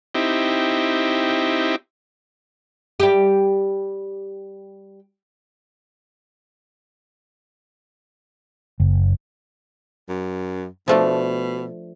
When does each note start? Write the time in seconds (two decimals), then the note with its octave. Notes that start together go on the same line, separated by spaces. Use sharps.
0.15 C4 D#4 E4 G4
3.00 G3 G4
8.80 F#1
10.09 F#2
10.88 B2 F3 A3 D4